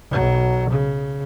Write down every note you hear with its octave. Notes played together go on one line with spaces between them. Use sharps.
B1 F#3
C#3